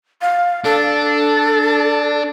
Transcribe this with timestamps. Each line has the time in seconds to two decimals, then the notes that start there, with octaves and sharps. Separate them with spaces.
0.21 F5
0.64 D4 A4